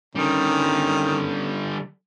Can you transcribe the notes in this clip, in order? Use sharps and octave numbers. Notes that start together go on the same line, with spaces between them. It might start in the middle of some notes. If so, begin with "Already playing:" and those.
D3 D#3 G3 C#4